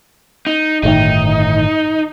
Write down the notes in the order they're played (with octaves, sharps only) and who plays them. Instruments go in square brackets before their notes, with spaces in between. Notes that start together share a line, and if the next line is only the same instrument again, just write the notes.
[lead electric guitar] D#4
[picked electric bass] G1 A2 D#3 [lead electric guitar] D#4